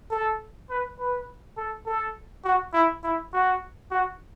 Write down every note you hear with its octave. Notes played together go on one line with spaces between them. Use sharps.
A4
B4
B4
A4
A4
F#4
E4
E4
F#4
F#4